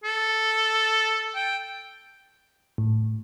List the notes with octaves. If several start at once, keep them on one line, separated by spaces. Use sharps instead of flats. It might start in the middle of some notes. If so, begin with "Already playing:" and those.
A4
G5
A2